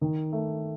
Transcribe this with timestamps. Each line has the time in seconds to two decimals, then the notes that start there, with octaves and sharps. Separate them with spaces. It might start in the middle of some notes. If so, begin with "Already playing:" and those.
0.01 D#3
0.32 A3